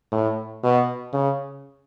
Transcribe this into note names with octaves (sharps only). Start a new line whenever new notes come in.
A2
B2
C#3